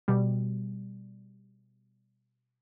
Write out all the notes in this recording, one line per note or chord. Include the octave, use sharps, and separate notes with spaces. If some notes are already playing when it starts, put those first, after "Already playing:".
B2 G3